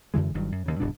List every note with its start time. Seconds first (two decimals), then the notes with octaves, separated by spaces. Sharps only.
0.14 F#2 D3 E3 G#3
0.34 G1 G2 D#3 F#3
0.52 F#2
0.66 D#2 C#3
0.80 D1 G2 B2 D4